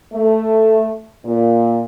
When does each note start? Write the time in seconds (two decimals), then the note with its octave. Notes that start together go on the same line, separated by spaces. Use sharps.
0.13 A3
1.25 A#2